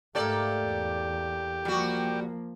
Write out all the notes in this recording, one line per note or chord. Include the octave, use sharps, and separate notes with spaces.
G#2 A3 A#3 G4 A4 D5
E2
F3 G3 A#3 F#4